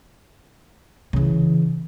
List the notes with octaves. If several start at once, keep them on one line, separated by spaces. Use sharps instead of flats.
C#3 E3